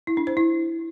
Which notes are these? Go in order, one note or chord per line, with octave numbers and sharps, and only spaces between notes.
E4
D4
C5
E4